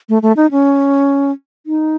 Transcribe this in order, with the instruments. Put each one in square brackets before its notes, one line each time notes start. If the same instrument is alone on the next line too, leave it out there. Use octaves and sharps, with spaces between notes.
[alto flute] A3
A3
D#4
C#4
D#4